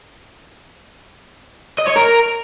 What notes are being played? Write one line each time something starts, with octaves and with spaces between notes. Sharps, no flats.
D#5
C#5
A#4